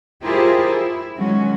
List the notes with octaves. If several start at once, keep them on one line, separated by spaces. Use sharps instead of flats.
E4 F4 G4 G#4 A#4 C5
E4
D#3 F#3 G#3 C#4 F#4